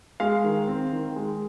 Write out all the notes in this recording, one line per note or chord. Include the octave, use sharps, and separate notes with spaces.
G#3 F5
D#3
C4
D#3
G#3